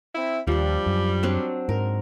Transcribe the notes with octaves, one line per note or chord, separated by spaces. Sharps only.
C4 E4
D#2 F3 G3 D4
F#2
F#3 C4 D4
G#2 A#4